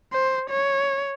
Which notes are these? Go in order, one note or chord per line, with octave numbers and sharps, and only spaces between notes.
C5
C#5